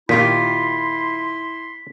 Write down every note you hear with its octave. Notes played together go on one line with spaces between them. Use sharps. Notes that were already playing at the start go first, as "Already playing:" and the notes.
A#2 D#3 E4 F4 G4 C6 B6